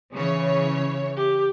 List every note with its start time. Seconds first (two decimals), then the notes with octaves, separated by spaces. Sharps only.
0.14 C#3 E3 C#5
1.17 G4